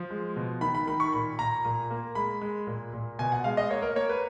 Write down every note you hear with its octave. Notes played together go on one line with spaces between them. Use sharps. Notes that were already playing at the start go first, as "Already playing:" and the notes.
Already playing: F3
G#3
B2
D#3 B5
B5
D#3 B5
C#6
A#2 B5
A#2 A#5
A#2
A#3
G#3 B5
G#3
A#2
A#2
B2 G#5
F#5
G#3 F5
D#5
A#3 C#5
A#4
A#3 C#5
B4